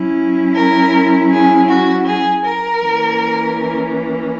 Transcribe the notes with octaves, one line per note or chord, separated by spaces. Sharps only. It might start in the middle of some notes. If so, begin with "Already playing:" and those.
Already playing: F#3 C#4 E4
A#4
G#4
F#4
G#4
A#4
E3 A#3 C#4